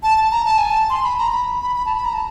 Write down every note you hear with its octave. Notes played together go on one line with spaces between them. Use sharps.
A5
A5
A#5
A5
G#5
A5
C6
B5
A#5
B5
B5
B5
A5
B5
A#5
A5